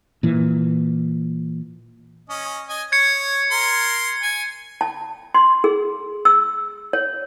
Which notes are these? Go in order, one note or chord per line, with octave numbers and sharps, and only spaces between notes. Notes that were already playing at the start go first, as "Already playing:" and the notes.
A#2 E3
C#4 D#5
D#5 G#5
C#5 G#6 C#7
A#4 C6
G#5
A5
C6
G#4
E6
C#5